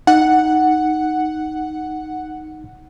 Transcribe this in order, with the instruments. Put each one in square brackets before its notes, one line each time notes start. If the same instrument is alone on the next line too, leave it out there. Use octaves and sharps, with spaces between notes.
[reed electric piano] D#4 [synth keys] F#5